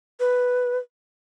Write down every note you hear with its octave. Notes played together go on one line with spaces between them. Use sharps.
B4